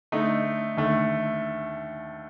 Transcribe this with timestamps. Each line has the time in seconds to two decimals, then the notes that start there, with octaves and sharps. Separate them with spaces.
0.12 D3 A3 D#4
0.77 D#2 D3 A3